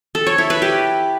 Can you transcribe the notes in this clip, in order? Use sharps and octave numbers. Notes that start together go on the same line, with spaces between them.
A4
C#5
E4
B4
G4